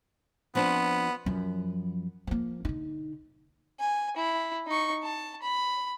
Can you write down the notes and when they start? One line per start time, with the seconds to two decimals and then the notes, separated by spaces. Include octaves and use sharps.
0.55 F3 B3 C4 D4
1.26 F#2 F3
2.27 F3 A#3
2.65 D3 D#4
3.80 G#5
4.17 E4
4.67 D#4 C#6
5.03 A5
5.42 B5